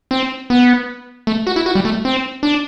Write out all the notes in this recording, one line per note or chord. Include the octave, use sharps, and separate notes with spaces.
C4
B3
A3
F#4
E4
F#4
G3
A3
C4
D4